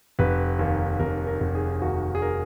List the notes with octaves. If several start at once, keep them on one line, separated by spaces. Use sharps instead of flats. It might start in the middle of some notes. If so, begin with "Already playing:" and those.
F1 B4
D#2
F1 A#4
A#4
F1
G#4
D#2 F#4
G#4
A#4